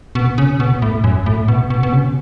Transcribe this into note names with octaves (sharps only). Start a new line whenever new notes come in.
B2
C#3
B2
A2
F#2
A2
B2
B2
B2
C#3